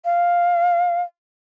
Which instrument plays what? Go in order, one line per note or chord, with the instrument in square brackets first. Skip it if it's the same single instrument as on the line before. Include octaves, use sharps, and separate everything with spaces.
[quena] F5